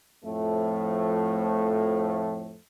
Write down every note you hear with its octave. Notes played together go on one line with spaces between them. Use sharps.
F2 A2 F3 A3